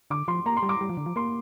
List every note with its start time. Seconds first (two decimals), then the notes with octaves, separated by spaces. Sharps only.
0.10 D3 D6
0.28 F3 C6
0.46 A#3 A#5
0.57 C6
0.63 G3
0.69 D6
0.81 G3
0.89 F3
0.97 D3
1.06 F3
1.16 A#3 C6